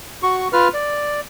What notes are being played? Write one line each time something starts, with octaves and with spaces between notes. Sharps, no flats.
F#4 C#6
F4 B4 F6
D5